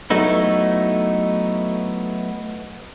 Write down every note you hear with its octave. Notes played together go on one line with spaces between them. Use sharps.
F#3 A3 B3 D#4 E4